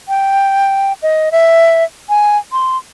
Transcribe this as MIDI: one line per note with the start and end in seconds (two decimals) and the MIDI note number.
0.08 0.93 79
1.02 1.29 75
1.32 1.84 76
2.09 2.38 80
2.52 2.77 84